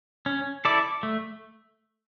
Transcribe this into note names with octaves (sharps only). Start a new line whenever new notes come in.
C#4
E4 A4 D5
A3